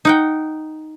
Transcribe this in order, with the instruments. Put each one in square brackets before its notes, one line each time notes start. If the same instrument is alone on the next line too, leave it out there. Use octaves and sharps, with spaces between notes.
[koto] D#4 F#5 G5